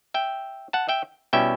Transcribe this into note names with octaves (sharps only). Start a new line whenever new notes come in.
E5 G5
F#5 A5
E5 G5
B2 G3 C#4 E4 E5 G5